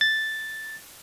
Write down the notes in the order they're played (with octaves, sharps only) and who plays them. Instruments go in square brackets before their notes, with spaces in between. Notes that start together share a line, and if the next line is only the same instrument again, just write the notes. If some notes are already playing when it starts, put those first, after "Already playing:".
[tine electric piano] A6